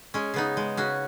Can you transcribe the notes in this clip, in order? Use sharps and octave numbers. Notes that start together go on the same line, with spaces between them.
G#3 C#4
C#3 B3 D#4
G#3
C#3 C#4 F#4